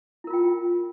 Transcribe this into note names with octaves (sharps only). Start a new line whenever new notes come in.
E4 F4 A#4 G5